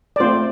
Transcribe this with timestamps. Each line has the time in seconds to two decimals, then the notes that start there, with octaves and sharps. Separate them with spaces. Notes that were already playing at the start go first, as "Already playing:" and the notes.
0.16 D5
0.20 A3 C4 F4 C5